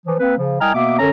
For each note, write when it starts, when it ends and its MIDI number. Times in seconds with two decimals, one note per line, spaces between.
0.06 0.15 52
0.06 0.15 53
0.19 0.35 58
0.19 0.35 60
0.19 0.35 71
0.37 0.58 49
0.37 0.58 53
0.60 0.70 36
0.60 0.70 75
0.60 0.70 79
0.60 0.70 80
0.60 0.70 82
0.60 0.70 89
0.74 0.96 47
0.74 0.96 58
0.74 0.96 59
0.74 0.96 76
0.74 0.96 86
0.99 1.10 42
0.99 1.10 50
0.99 1.10 61
0.99 1.10 69
0.99 1.10 73
0.99 1.10 82